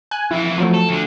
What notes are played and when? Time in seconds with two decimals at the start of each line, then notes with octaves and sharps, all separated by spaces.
0.11 G#5 F#6
0.31 F2 E3 E4
0.58 F3 F#3 A3
0.74 A4
0.89 D2 D3